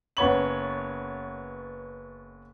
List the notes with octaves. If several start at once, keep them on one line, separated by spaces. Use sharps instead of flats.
F#1 B3 C#5 F#7